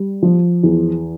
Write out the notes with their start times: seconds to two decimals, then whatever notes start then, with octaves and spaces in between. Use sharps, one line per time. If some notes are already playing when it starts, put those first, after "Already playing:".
Already playing: G3
0.22 F3
0.63 E2